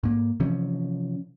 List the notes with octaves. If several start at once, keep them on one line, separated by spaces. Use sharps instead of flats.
G#2 A#3
C3 E3 F3 C#4